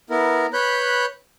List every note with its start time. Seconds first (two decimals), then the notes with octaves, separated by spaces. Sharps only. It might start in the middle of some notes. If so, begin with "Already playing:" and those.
0.10 B3 E4 A#4
0.53 B4 C#5 B5 F#6 G6